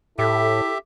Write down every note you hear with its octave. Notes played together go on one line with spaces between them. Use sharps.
A2 E4 G4 A4 E5